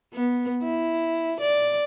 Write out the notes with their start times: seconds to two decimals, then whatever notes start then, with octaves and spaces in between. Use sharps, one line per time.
0.13 B3
0.63 E4
1.41 D5